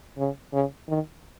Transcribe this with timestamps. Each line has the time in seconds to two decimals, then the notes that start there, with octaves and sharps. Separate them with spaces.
0.17 C#3
0.53 C#3
0.88 D#3